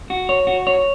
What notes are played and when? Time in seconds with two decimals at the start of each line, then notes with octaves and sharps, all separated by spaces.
0.10 F#4
0.29 C#5
0.47 F#4
0.67 C#5